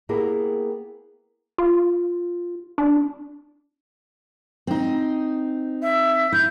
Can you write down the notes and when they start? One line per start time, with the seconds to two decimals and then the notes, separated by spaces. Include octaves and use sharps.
0.09 A#3 B3 E4 G4 G#4 A#4
1.58 F4
2.78 D4
4.67 C4 D#4
5.82 E5
6.32 E4 G6